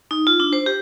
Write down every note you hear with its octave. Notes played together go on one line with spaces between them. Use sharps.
D#4
F4
D4
C5
G4